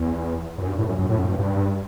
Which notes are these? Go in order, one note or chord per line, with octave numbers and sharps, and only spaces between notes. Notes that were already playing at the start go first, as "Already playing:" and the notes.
Already playing: E2
F#2
G2
A2
F#2
F#2
A2
F#2
G2
G2